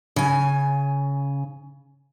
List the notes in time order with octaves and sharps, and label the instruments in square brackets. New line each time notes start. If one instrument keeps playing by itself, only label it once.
[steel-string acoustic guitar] C#3 G#5